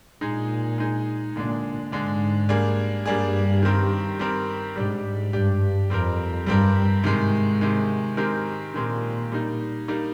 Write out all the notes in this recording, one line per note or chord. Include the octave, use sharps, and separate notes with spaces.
A#2 G#3 D#4 G#4
G#3 D#4 G#4
A#2 D3 G#3 D4
G#2 D3 G#3 D4
G3 A#3 D4 G#4
G2 G3 A#3 D4 G#4
D#3 G3 C4 G4 A#4
D#3 G3 C4 G4 A#4
G#2 G3 D4 G4
G2 G3 D4 G4
F2 G3 C4 G4 A#4
G2 G3 C4 G4 A#4
G#2 C3 D#3 G#3
C3 D#3 G#3
D#3 G#3 C4 G4 A#4
A#2 D#3 G#3 C4 G4 A#4
G3 A#3 D#4
G3 A#3 D#4